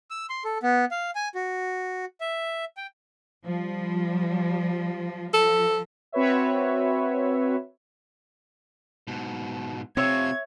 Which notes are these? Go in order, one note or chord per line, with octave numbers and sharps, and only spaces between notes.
E6
C6
A4
B3
F5
G#5
F#4
E5
G5
F3 G3
F3 A4
C4 F#4 B4 C#5 E5
G#2 B2
C3 C4 F4 C#5 E5 C#6 G#6